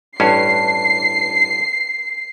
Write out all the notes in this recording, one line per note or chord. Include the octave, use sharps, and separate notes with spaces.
A1 G2 C#4 C7